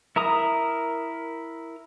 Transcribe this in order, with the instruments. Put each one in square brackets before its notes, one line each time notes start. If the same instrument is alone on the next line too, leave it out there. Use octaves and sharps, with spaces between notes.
[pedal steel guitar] E4 A#4 A#5 D#6